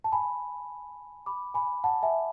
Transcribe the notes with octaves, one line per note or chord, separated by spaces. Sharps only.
A5
G#5 B5
B5 D6
G#5 B5
F#5 A5
E5 G#5